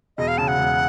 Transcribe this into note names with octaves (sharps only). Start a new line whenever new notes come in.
E1 D#5
F5
C#3 A5
F#5
E1